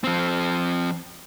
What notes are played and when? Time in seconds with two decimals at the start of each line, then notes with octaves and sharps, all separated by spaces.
0.04 F3 C4